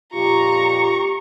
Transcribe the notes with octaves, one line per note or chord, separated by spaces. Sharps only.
F2 A#2 F4 G4 A#5 C#6